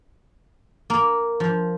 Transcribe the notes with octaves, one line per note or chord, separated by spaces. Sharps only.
A#3
F3